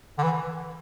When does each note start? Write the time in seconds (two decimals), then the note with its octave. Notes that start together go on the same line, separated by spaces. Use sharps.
0.18 D3
0.24 E3